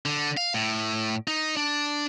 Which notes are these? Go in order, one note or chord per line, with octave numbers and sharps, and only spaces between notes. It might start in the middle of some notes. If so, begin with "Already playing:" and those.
D3
F5
A2
D#4
D4